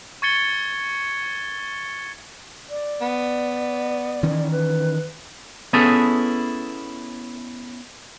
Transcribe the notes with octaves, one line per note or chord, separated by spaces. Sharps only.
C#6 G#6 A6 C#7 G7
D5
B3
D#3 E3 C#4
B4
B3 C#4 E4 G#4 A4 B4